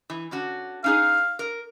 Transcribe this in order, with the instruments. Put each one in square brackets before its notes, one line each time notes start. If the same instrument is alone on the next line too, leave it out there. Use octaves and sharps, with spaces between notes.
[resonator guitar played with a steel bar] E3
D3 C#4 F#4
[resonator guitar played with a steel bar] C#4 D#4 G#4 [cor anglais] F5
[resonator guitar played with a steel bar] A#4